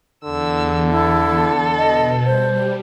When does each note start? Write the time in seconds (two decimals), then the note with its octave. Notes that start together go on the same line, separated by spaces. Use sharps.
0.24 E2 D3 E6
0.90 E4 A4
1.77 B2 D#5
2.25 G3 C5